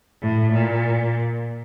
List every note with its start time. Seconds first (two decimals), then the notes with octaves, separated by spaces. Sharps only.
0.22 A2
0.53 A#2